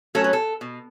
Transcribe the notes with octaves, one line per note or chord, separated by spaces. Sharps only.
F#3 A3 C#4 A4
B4
A4
B2